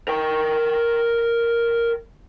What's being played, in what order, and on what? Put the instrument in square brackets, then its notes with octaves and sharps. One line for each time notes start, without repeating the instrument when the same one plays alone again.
[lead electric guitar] A#4 G5